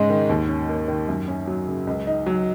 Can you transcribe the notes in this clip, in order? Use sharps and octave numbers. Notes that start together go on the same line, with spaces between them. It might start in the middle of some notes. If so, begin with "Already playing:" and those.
Already playing: G#2 C#3 G#3 C#4
D#3
D#2
C#4
A#3
D#3
F#2
C#4
F#3
C#3
C#2
D#4
F#3